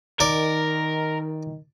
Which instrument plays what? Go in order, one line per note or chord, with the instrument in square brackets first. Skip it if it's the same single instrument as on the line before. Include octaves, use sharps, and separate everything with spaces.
[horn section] D#3 [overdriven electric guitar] A#4 [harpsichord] D5